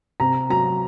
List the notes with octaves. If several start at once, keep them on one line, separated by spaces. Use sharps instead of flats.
C3 A#5
F#3 A#5